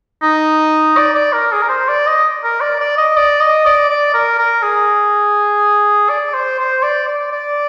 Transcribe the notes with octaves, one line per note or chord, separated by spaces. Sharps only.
D#4
D5
D5
A#4
G#4
A#4
C5
D5
D#5
A#4
D5
D5
D#5
D5
D#5
D5
D5
A#4
A#4
G#4
D5
C5
C5
D5
D5
D5